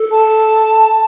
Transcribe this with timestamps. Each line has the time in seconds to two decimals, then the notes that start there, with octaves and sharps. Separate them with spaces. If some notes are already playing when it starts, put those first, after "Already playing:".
Already playing: A4
0.11 A5